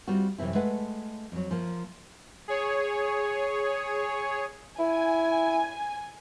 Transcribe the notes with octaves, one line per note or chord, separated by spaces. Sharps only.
G3 C4 F4 F#4
F#2 C3 E3 C4 E4
G#3 A3 B4 F#5
F2 F#3
F3 A#3
G#4 C#5
E4 G#5